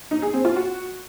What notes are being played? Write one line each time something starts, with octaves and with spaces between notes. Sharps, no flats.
D#4
G#4
C4
F4
F#4